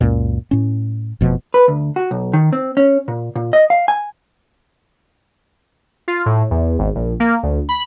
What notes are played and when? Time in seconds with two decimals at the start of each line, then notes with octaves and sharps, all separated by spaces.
0.01 C#2 F#2 A#2
0.51 A2 C#4
1.21 F1 B2 F3
1.54 B4
1.68 D2
1.96 F#4
2.11 B1
2.33 D#3
2.53 C4
2.77 C#4
3.08 A#2
3.35 A#2
3.53 D#5
3.70 F5
3.88 G#5
6.08 F4
6.26 A2
6.51 E2
6.79 G#1
6.95 A#1
7.20 A#3
7.43 D2
7.69 B5